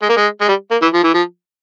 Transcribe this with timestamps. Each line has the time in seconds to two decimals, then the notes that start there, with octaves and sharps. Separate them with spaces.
0.03 G#3
0.09 A#3
0.17 G#3
0.41 G#3
0.49 G3
0.71 A#3
0.82 E3
0.94 F3
1.04 E3
1.14 F3